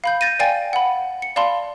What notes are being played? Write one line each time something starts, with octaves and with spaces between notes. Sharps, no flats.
F5 B5 G6
G6 A6 A#6 D#7
D5 F5 G5 G#5 A6
F#5 B5
C#7
D5 F5 A5 B5 C6